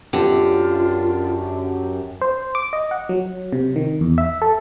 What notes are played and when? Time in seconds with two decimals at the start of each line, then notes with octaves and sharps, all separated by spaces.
0.13 F#2 D3 F4 G4
2.21 C5
2.55 D6
2.73 D#5
2.91 F#5
3.09 F#3
3.53 C3
3.76 D#3
4.01 E2
4.18 E5
4.42 A4